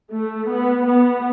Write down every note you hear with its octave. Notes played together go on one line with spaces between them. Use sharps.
A3
B3
B3